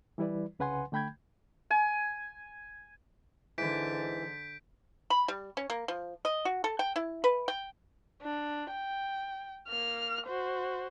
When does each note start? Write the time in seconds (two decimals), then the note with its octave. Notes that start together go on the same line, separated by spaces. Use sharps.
0.18 E3 G3 E4 B4 D5
0.59 C2 C#3 B4 F#5 G#5 C6
0.92 D3 A3 G5 B5 G6 G#6
1.70 G#5
3.58 G#2 D3 E3 G6 B6 D7
5.10 B5
5.28 G3
5.57 C#4
5.70 A#3
5.88 F3
6.25 D#5
6.45 F#4
6.64 A4
6.79 G5
6.96 E4
7.24 B4
7.48 G5
8.22 D4
8.71 G5
9.68 A#3 F6
10.26 F#4 C5